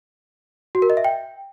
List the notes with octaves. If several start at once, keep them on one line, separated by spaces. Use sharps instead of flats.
F#4
A#4
D#5
E5
G5